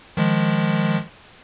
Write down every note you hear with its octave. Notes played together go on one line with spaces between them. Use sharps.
D#3 F3 G#3